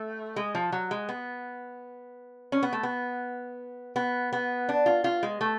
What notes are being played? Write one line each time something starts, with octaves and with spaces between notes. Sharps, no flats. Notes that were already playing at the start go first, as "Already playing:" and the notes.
Already playing: A3
G#3
F3
F#3
G#3
B3
C#4
B3
A3
B3
B3
B3
D4
F4
F4
G#3
A3